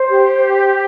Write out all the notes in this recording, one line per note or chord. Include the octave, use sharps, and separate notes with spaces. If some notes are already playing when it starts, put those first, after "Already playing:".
Already playing: C5
G4
C5